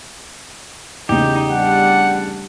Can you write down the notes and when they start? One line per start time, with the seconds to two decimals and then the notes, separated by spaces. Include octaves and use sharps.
1.09 E2 A2 C#3 D#4 G4
1.51 G3 D4 F#5